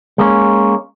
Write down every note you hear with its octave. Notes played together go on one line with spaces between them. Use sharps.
G#3 A#3 C#4